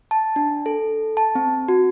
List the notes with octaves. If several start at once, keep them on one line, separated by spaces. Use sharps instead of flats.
A5
D4
A4
A5
C4
F#4